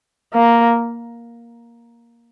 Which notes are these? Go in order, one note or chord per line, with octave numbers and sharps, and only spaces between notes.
A#3